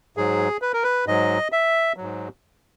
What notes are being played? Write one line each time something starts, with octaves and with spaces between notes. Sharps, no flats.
G#2 F#3 G#4
B4
A#4
B4
G#2 F#3 D#5
E5
G#2 F#3